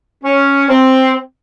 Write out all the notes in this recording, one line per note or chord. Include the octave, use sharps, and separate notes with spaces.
C#4
C4